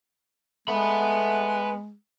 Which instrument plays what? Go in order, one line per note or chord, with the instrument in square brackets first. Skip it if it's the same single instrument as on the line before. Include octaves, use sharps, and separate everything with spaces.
[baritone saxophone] G#3 [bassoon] A3 [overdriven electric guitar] B3 B5